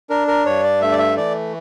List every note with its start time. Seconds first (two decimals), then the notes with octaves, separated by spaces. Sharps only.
0.10 D4 A#4
0.28 A#4
0.46 G2 C#5
0.63 D5
0.81 A3 E5
0.92 D5
0.99 E5
1.17 E3 D5